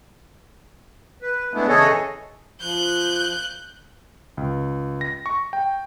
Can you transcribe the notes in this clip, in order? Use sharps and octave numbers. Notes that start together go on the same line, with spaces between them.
B4
G#3 A3 B3 D4 E4
C#3 E3 G#4 A4 C#5 D#5
F3 F#6 G6
C#2
A#6
C#6
G5